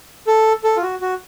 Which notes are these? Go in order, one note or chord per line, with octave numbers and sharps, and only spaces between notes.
A4
A4
F4
F#4
F#4